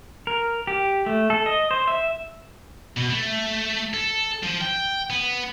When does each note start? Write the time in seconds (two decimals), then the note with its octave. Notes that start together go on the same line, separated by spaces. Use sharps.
0.27 A#4
0.67 G4
1.06 A3
1.30 A4
1.46 D#5
1.71 C5
1.88 E5
2.97 B2
3.10 A3
3.94 A4
4.43 F3
4.61 G5
5.10 B3